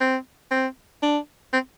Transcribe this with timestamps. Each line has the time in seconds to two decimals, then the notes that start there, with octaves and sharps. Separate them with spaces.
0.01 C4
0.51 C4
1.03 D4
1.53 C4